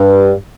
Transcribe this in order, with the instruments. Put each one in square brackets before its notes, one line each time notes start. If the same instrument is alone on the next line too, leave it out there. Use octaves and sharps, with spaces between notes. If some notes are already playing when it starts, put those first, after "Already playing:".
Already playing: [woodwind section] G2